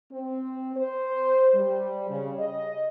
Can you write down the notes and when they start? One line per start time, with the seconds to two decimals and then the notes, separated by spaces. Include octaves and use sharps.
0.12 C4
0.77 C5
1.55 G3
2.10 C#3
2.39 D#5